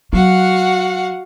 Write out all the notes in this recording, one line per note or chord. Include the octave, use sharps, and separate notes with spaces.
F#3 F#4 F5 F#5